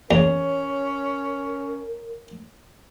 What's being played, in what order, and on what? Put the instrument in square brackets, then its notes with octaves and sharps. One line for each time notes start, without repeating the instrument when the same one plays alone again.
[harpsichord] E2 [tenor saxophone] C#4 [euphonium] A#4 [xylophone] C#5 F7